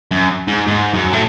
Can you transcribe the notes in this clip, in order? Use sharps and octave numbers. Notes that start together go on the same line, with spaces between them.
F#2
G#2
G#2
F#2
A2